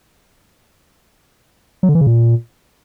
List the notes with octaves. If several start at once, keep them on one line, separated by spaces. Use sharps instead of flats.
F#3
D3
E3
C#3
A#2